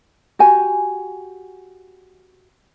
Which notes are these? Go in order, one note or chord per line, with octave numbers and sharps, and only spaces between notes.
F#4 G4 G#5